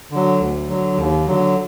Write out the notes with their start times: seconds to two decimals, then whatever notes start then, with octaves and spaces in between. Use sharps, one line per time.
0.11 D3 F#3
0.40 D2
0.69 D3 F#3
0.97 D#2
1.27 D3 F#3